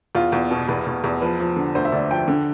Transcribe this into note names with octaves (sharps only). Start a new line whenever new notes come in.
E2 F4
E2
B2
E2 B4
E2
E2
F3 B4
F3
D3
D2 C5
E5
D2 D5
F3 G5
D3